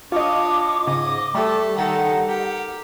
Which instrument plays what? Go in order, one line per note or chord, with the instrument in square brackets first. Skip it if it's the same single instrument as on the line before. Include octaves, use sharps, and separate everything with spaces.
[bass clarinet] D4 [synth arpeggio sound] F4 D#5 [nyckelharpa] C#5 [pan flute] D6
[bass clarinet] G#2 [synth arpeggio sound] C#3 [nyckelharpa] D#5
[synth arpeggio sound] G3 [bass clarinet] A3 [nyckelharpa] A4
[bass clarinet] D#3 [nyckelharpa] D#4 A4 [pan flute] F#5
[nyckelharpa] G4 [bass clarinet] A#4